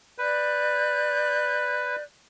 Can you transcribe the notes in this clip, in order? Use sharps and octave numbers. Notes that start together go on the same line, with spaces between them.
B4 D5 F#6 G6